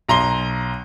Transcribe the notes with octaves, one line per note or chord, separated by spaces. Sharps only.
B1 A#5 C6 G7